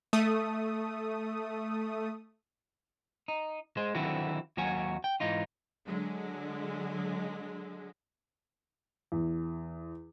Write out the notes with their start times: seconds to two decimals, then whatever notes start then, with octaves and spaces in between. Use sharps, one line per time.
0.13 A3 D#6
3.28 D#4
3.77 G#3 C5
3.95 D3 D#3 F#3 C4 E4 F#4
4.57 D#2 F#3 F#4 C#5 G#5
5.04 G5
5.20 G#2 E3 D#4 F4
5.85 D3 F#3 G#3
9.12 E2